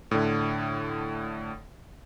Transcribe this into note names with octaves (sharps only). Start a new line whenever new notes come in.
A2 D3